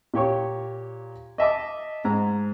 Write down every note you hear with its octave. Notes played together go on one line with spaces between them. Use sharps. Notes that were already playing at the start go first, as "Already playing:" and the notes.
A#2 G4 C#5 C#6
D#5 E5 A5 D6
G#2 A#5